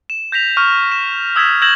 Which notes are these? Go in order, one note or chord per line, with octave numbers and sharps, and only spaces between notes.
E7
G6 A#6 B6 F7
C#6 F6
E7
D#6 E6 G#6 A6 B6 E7
E6 G6 G#6 A#6 E7 F#7